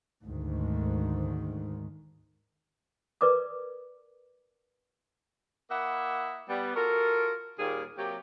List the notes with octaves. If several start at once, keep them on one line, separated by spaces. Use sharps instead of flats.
D2 G#2 D#3
A#4 B4 D5 D6 D#6
A#3 E4 D#5 E5 F#5
G3 B3
F4 F#4 A4 A#4
D#2 A#2 D#3 G3 A#3 G#4
C3 F#3 A#3 G4